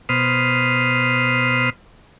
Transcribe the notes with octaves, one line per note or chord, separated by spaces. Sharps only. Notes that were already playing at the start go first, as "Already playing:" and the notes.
B2 C5 B5 D#6 F6